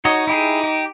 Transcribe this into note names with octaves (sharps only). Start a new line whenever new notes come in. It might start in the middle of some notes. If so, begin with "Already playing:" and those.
D#4 F#4 C#5 D#5
E4 G4 G#4
G4